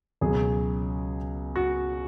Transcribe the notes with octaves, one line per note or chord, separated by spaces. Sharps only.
C#2 B2 F#3 G#4
F#4